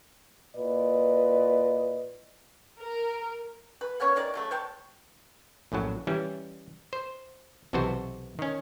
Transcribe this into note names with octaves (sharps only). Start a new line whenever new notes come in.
A#2 E4 B4 D5 D#5
A#4
B4
A#3 B3 C#4 C#5
D#3 A#4 D5
C#3 F#3 A3
C5 C#5 G5 A5
A#1 F#2 A2 F#3
E3 G3 C#4
C5
B1 C3 E3 F#4 C5 A5
D#3 C#4